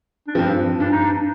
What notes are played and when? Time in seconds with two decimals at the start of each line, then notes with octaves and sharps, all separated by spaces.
0.27 D4
0.35 G2 F3 C4
0.80 G2 D4
0.92 D#4
1.03 D4